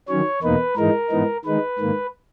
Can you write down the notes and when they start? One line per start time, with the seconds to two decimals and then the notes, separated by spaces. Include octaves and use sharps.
0.09 D#3 F#3 C#4 C#5
0.42 E2 B2 A#3 D#4 B4
0.76 G#2 E3 G#3 D#4 A#4
1.10 G#2 E3 B3 D#4
1.45 D#3 G#3 D#4 B4
1.79 G#2 D#3 A#3